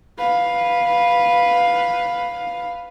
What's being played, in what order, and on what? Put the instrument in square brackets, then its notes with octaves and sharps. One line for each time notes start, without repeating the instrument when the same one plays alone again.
[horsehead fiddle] B4 F5